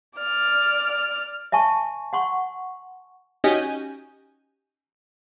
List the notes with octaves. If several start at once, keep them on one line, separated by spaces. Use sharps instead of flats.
D5 F6
E5 G#5 A5 C#6
F#5 C6 C#6
C#4 D#4 F#4 G4 D#5 G#5